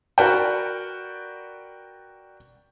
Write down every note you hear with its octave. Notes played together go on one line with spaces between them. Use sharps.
F#4 A#4 B4 D5 F#5 G5